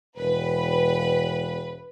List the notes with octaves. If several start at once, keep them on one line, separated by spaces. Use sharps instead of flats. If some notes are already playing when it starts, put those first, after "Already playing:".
E1 B4